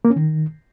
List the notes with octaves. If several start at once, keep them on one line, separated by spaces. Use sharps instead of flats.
A#3
C#4
D#3